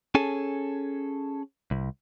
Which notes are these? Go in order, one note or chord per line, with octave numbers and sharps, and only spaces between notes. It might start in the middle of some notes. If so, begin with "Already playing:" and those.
C#4 G#4 A4 G#5 A5
C2